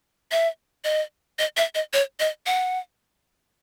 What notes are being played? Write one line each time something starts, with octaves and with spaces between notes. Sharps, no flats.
E5
D#5
D#5
E5
D#5
C#5
D#5
F#5